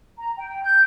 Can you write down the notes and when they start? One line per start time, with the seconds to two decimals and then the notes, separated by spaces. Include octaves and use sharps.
0.18 A#5
0.37 G5
0.62 G6